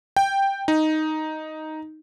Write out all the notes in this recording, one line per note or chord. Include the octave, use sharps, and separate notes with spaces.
G5
D#4